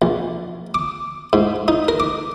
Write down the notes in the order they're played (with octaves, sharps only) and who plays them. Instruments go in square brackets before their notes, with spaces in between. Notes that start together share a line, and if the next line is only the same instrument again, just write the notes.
[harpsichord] A#1
D6
G#2
D#4
A#4
D6